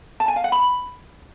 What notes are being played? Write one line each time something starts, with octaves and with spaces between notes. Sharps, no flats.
A5
G#5
F5
F#5
B5